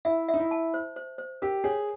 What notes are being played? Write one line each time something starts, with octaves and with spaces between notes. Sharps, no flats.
E4 E5
E5
D#4
E4
A5
C5
C5
C5
G4 A#4
G#4 C#5